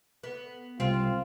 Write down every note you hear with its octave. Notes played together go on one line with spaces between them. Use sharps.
B3
C2 C4 F4